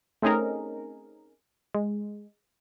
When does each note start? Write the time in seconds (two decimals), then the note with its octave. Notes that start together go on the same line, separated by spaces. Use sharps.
0.22 A3 C4 C#4 D#4 G#4 A#4
1.75 G#3